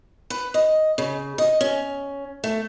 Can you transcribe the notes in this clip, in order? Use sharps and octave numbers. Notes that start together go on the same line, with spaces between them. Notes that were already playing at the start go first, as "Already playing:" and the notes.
B4
D#5
C#3
D#5
C#4
A3